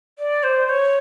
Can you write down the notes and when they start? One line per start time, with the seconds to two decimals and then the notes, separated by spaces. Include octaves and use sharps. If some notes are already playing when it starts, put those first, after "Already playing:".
0.19 D5
0.43 C5
0.69 C#5